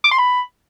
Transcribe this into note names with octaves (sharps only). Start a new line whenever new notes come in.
D6
C6
B5